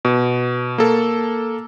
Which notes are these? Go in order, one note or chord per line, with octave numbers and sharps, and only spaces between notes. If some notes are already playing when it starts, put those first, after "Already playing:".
B2
A#3 A4